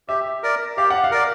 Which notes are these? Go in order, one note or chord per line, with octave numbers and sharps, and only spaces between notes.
G4 E5
A#4 D5
G4 F5
F#5
F5
A#4 D5